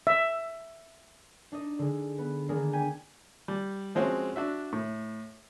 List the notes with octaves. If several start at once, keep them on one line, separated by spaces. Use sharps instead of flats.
E5
D4 D#4 D#5
D3 G#3
B3
D#3 G#3 A#3 D4
G5 G#5 B6 D#7
G3
F3 G#3 C4 C#4 F#4
D4 F#4 E5
A2